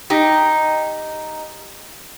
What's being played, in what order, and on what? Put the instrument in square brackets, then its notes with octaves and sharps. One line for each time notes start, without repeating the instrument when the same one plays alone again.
[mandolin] D#4 [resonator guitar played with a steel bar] G4